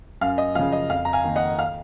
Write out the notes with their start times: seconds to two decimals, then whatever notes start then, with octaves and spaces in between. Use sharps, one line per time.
0.21 F#2 F5
0.38 D#5
0.55 F3 F5
0.59 C#3
0.72 D#5
0.90 F2 F5
1.05 A#5
1.13 F5 G#5
1.24 D#3 A#3
1.36 D#5 F#5
1.59 F5